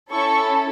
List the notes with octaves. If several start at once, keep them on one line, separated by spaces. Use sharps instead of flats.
C#4 E4 A4 C#6